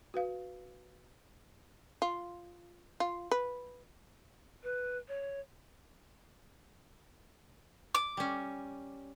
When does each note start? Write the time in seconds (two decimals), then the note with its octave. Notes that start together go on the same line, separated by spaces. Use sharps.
0.14 F#4 B4 F5
2.02 F4
3.00 F4
3.31 B4
4.63 B4
5.08 C#5
7.95 D6
8.17 G3 C#4